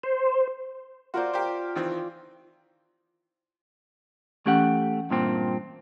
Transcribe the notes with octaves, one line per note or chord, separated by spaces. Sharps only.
C5
F4 F#4 A#4 C5 D5
G4 A#4 C5
D#3 E3 C4
E3 A3 C#4 G4 F#5
G2 A#2 C4